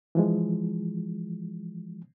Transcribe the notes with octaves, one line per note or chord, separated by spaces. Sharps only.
E3 F3 G#3